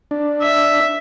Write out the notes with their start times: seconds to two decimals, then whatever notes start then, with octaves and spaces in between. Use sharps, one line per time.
0.11 D4
0.42 E5